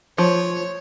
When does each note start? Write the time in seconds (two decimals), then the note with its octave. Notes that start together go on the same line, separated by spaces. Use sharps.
0.18 F3 C#5